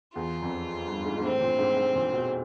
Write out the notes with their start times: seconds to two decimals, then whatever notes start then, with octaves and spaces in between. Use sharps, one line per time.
0.15 E2 F4
0.42 F2
0.87 G2
1.05 G#2
1.18 G#2
1.23 A2 C4
1.41 A#2
1.59 G#2
1.77 G#2
1.95 A#2
2.13 B2